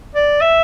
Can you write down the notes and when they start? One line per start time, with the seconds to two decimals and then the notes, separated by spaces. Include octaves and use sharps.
0.15 D5
0.41 E5